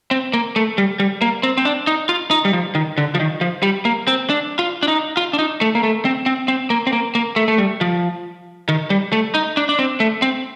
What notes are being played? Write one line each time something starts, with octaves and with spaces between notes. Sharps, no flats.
C4
A#3
A3
G3
G3
A#3
C4
C4
D4
D#4
F4
D#4
G3
F3
D#3
D3
F3
D#3
F3
G3
A#3
C4
D4
F4
D4
D#4
F4
D4
D#4
A3
A#3
A3
C4
C4
C4
A#3
C4
A#3
A#3
A3
A3
G3
F3
D#3
G3
A3
D#4
D4
D4
C4
A3
C4